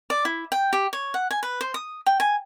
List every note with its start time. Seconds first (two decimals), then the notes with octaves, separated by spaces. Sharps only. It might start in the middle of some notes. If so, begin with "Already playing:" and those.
0.10 D5
0.25 E4
0.52 G5
0.73 G4
0.93 C#5
1.14 F#5
1.31 G#5
1.43 B4
1.61 C5
1.74 D#6
2.06 G5
2.20 G#5